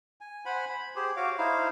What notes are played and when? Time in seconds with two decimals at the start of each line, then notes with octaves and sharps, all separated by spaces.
0.21 G#5
0.45 C5 F#5 G#5 B5
0.69 B5
0.96 G4 G#4 C5
1.16 F#4 C#5 F5 D6
1.38 D#4 E4 C5 F5